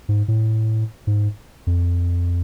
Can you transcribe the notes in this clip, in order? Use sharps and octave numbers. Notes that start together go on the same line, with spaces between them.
G#2
A2
G#2
F2